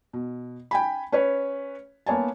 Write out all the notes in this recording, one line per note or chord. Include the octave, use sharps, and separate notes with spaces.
B2
G5 G#5 B5
C#4 B4 C#5
A#3 B3 C#5 G#5 A5